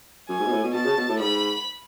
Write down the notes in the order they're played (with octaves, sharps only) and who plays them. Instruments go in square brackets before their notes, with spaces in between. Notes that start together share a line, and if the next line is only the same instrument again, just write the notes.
[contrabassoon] F#2 [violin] G#5
[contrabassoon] G#2
B2
A2
B2
[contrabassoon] B2 [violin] A5
[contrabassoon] C#3
B2
A2
[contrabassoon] G#2 [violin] B5